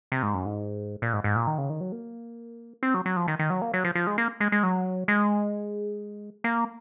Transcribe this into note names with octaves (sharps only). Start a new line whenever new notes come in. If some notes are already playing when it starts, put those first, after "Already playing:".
C3
G#2
F#2
G#2
A#2
G#2
G#2
A#2
D#3
C#3
D#3
F#3
A#3
C4
F#3
F#3
F3
D#3
D#3
F#3
A#3
F#3
F3
F3
G#3
A#3
G#3
G#3
F#3
G#3
A#3